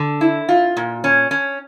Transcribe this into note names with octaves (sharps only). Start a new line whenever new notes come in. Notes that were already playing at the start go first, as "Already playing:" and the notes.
Already playing: D3
E4
F4
A#2
C#4
C#4